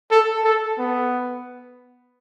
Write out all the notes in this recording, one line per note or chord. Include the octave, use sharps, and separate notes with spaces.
A4
A4
B3